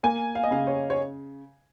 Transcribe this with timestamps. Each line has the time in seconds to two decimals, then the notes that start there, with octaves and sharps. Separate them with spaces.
0.03 A#3 G#5
0.35 F5
0.43 D#5
0.51 C#3 F5
0.67 C#5
0.90 C#5